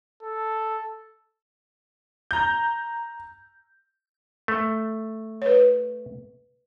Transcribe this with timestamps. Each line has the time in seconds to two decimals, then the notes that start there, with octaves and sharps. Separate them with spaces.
0.23 A4
2.31 A#5 G6
4.48 A3
5.42 B4 C#5